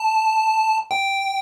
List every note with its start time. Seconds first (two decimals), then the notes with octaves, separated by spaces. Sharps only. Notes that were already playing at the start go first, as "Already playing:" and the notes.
Already playing: A5
0.91 G5